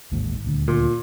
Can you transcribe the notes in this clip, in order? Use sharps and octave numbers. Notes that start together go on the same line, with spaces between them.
A1 D#2 G#2
D#1 D2
A#2